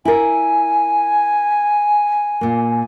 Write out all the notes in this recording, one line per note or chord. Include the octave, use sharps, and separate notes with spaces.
E4 A#4 G#5
A#2 A#3